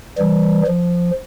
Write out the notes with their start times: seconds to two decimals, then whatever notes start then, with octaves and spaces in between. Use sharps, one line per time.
0.18 E3 G3
0.67 F3